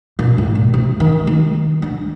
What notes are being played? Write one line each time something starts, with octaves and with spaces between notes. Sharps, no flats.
A#2
A2
A#2
C3
D#3
D#3
D3